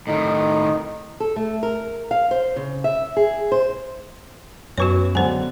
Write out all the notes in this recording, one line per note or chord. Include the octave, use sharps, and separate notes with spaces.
A2 D#3 D#4
A4
A3
A#4
F5
C5
C#3
E5
G#4
C5
B1 F#2 F#4 B4 C#5 C#6
C#2 D3 F#3 B3 C5 G#5